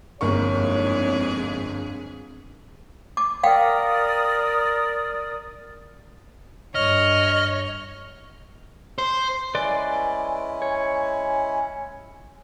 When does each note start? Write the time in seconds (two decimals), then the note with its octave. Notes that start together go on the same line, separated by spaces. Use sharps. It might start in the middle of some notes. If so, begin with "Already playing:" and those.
0.21 G1 C2 F2 G#2 A#3 G#4 C#5 C#6
3.17 D6
3.43 A#4 D5 F5 G5 D#6
6.75 G2 C#5 D#5 F6
8.98 C5
9.55 G#3 C#4 E4 B4 D5 G#5 C6
10.62 C#5